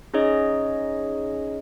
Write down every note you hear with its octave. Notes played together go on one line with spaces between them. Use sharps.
C#4 D#4 G#4 C#5 D#5